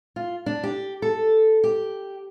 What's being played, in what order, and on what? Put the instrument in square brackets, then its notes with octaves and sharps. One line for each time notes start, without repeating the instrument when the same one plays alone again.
[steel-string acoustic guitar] F4
D4
G4
A4
G4